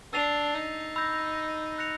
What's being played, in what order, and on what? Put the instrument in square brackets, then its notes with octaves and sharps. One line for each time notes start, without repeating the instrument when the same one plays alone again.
[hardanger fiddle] D4 [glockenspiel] E6 A6 C7 F7
[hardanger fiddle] D#4
[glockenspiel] B5 E6 G6 A#6
F#6 A#6 C#7 F7